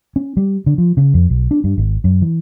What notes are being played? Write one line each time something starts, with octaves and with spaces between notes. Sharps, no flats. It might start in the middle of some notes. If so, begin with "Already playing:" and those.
C#4
G3
D3
F3
C#3
F2
B1
D4
G2
G#1
F#2
E3